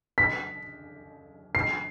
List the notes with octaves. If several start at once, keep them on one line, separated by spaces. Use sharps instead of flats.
B6
C7